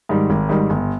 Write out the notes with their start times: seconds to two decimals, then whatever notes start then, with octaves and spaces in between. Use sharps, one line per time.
0.09 G#2 D#3 G3
0.30 G#1
0.49 G#2 D#3 G3
0.70 G1